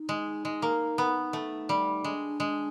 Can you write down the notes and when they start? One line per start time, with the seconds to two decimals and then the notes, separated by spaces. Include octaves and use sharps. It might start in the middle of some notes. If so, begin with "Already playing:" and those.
Already playing: D#4
0.09 G#3
0.45 G#3
0.62 A#3
0.98 B3
1.33 A3
1.69 G3
2.04 G#3 D4
2.40 G#3